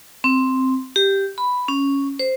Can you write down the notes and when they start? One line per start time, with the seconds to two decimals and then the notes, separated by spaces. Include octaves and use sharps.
0.24 C4
0.96 G4
1.38 B5
1.68 C#4
2.19 C5